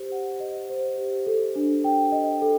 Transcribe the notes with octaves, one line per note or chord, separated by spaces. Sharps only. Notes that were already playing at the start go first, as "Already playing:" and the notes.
Already playing: G4 C5
F#5
D#5
C5
G4
A4
D4
G5
D#5
A4